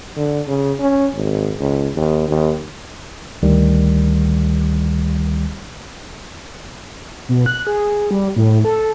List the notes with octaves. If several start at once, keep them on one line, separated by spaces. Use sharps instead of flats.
D3
C#3
C#4
G#1
C#2
D#2
D#2
D2 D#3 G3
B2
F#6
G#4
G3
A2
A4